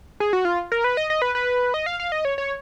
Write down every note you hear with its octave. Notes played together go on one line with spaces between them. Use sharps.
G#4
F#4
F4
A#4
B4
D#5
D#5
B4
B4
D#5
F5
F5
D#5
C#5
C#5